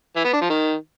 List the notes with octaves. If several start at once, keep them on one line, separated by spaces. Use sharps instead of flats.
E3
B3
D4
F3
D#3